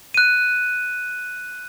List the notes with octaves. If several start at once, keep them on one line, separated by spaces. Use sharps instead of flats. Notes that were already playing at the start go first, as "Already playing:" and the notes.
F#6 D#7